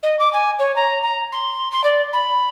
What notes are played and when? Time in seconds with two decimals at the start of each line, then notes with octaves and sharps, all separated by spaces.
0.03 D#5
0.19 D6
0.33 G#5
0.59 C#5
0.75 A#5
1.02 A#5
1.32 C6
1.71 C6
1.83 D5
2.13 B5